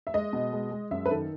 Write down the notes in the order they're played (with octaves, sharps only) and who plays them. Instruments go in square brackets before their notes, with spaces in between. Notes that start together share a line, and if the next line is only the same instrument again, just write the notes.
[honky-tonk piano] E5
[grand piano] G#3 [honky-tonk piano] D#5
[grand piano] B2
G#3
G#3
[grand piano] F#2 [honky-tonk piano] E5
[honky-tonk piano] B4
[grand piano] D#3 [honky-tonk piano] A4